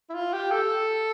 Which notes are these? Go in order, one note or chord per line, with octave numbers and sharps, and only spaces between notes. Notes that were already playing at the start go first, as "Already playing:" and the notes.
E4
F4
G4
A4